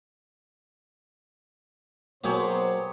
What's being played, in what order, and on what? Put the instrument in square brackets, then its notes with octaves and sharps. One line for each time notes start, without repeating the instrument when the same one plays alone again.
[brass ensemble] B2 C5 [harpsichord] F#3 A#3 [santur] G4 G#4 C#5